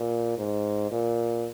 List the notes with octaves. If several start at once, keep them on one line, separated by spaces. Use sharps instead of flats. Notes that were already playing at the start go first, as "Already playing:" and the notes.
Already playing: A#2
G#2
A#2